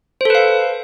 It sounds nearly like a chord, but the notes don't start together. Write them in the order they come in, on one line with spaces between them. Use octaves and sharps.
C5 A4 B4 F5